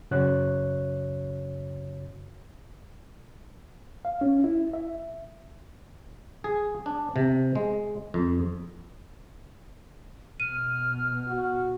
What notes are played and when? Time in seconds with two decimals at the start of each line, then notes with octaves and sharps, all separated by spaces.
0.11 F#2 C#3 F#4 C#5 D5 F#6
4.05 F5
4.21 C#4
4.44 E4
4.73 E5
6.44 G#4
6.86 D4
7.16 C3
7.55 G#3
8.14 F2
10.40 B2 F6 D#7
11.28 F#4